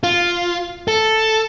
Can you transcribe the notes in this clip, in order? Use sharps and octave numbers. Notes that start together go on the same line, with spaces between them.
F4
A4